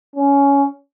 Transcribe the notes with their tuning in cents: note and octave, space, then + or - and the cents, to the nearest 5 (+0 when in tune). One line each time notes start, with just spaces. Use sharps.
C#4 +15